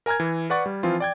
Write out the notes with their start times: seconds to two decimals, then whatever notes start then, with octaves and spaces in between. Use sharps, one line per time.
0.06 A#4 G#5 A#5 F6 G#6
0.20 E3
0.50 B4 D5 F#5 C#6 A6
0.66 G3
0.83 E3 F3 C4 F4
1.00 D5 G5 G#6